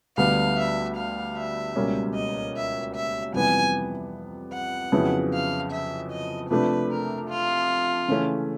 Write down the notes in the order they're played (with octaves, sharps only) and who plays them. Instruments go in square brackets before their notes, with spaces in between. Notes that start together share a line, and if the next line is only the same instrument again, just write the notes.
[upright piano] D2 D3 G3 B3 [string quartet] F5
[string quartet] E5
F5
E5
[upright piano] C#2 B2 G3 A#3 C#4
[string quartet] D#5
E5
E5
[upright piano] F2 C3 E3 G3 B3 [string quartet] G#5
[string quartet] F#5
[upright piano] F2 C#3 F#3 B3 E4
[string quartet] F5
E5
D#5
[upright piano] C3 F3 A3 D4 [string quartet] B4
[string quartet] A#4
F4
[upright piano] C#3 E3 A3 C#4